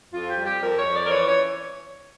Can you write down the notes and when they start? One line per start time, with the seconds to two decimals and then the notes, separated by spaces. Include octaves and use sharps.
0.12 F2 F4
0.28 G4
0.37 G3
0.45 G4
0.61 F2 A#4
0.78 C#5
0.86 F2
0.94 D5
1.05 A#4
1.10 E3 C#5
1.27 C#5